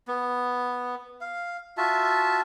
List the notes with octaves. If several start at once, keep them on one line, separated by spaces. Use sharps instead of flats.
B3
F5
F4 F#4 E5 A5